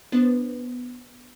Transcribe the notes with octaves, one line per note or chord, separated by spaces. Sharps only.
B3 D4 B4 C5